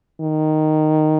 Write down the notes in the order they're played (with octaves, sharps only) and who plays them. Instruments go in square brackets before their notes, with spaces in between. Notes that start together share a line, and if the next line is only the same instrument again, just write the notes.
[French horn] D#3